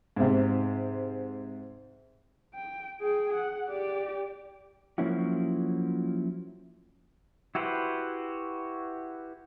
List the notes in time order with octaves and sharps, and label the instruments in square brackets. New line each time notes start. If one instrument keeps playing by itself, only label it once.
[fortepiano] G#2 C3
[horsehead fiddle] G5
G#4 G5
F#5
G4 D5
[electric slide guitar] F3 F#3 A#3 C#4 E4 F#4
[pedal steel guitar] E4 F#4 G4 B4 C5